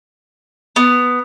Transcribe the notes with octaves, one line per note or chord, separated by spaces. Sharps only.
B3